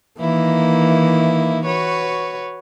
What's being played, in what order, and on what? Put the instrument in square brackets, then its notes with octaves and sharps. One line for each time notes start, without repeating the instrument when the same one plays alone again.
[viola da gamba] D#3 A#3 E4 [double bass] E3
[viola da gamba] F#4 B4 C#5